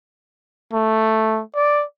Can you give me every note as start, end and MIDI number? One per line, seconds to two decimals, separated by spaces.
0.73 1.41 57
1.56 1.84 74